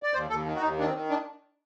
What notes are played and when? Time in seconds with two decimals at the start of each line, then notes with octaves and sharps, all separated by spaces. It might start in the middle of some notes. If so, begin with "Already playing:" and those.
0.03 D5
0.14 D#2 C5
0.30 D#2 A4
0.46 D#3
0.56 F#4
0.61 D#2 D#4
0.78 D#3 D4
0.86 C4
0.94 D#3
1.10 D4